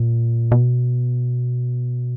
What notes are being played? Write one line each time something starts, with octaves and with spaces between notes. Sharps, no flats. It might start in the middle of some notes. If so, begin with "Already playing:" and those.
Already playing: A#2
B2